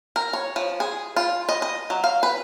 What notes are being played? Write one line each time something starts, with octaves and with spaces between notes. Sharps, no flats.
A#4
C#5
F3
G#4
F4
D#5
D#5
F#3
F5
B4